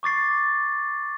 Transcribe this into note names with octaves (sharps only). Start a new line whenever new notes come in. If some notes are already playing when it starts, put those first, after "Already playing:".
C#6 D6 A6 C7